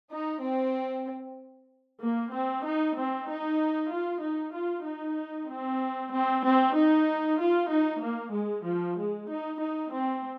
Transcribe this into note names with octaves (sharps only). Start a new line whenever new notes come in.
D#4
C4
A#3
C4
D#4
C4
D#4
F4
D#4
F4
D#4
C4
C4
C4
D#4
F4
D#4
A#3
G#3
F3
G#3
D#4
D#4
C4